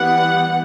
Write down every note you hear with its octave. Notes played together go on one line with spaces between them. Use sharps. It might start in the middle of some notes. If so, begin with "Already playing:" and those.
Already playing: E3 G3 B3 F#5